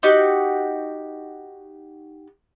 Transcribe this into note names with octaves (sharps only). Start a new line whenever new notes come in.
D#4 F#4 G4